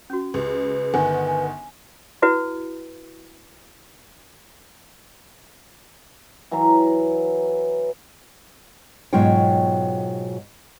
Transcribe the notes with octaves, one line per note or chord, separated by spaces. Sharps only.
C#4 F#4
C#2 G4 B4
G1 D#3 F#5 G#5
G#5
E4 F#4 B4
E3 F#3 E5 A#5
G#2 B2 F#3 F4 C#5 G5